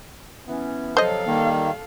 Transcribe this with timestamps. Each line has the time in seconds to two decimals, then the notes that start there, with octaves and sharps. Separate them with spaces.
0.47 E3 B3 C#4
0.97 C3 F3 F#3 A4 C5 D#5 F5
1.27 D#3 G3 A#3